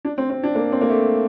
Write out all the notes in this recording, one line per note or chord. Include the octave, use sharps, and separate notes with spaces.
D4
C4
C4
D4
A#3
C4
A#3
A3